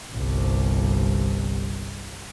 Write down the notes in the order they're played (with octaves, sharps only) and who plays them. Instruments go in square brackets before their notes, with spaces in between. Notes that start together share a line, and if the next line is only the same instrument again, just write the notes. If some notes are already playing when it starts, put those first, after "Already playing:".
[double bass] G1 C2